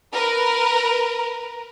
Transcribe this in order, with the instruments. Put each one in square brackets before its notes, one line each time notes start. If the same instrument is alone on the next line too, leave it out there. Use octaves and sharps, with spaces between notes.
[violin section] A#4 B4